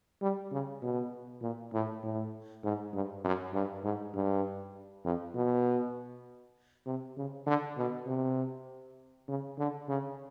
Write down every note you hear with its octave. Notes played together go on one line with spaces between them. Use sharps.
G3
C#3
B2
A#2
A2
A2
G#2
G2
F#2
G2
G#2
G2
F2
B2
C3
C#3
D3
B2
C3
C#3
D3
C#3